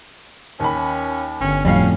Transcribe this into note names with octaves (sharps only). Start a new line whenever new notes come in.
D#2 C#4 B5
G1 C#4
F2 A2 G3 C#4 F5